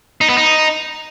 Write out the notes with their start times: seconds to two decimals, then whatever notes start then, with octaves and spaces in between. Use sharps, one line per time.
0.21 D#4
0.29 B3
0.38 D#4